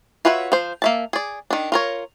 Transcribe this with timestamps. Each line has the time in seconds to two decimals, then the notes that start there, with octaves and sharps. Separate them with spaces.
0.25 F4 F#4 B4 C#5 E5
0.52 F3 C5
0.82 A#3 E5 A5
1.13 G#4 D5
1.51 D#3 D4
1.72 F4 A#4 C#5